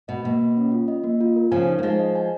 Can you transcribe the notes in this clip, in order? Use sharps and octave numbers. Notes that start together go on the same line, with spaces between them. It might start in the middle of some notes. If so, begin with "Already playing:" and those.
B2 D#5
B2 A#3
A#3
C#4
F4
D#5
A#3
F4
A#4
C#3 F3 G#5
D#4
A#3
F3 G#3 G#4
D#5
G#5